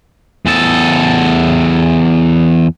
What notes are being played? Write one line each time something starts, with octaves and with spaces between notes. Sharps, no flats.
E2 A4